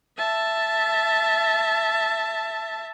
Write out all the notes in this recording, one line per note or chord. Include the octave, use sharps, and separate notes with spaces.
E5 A5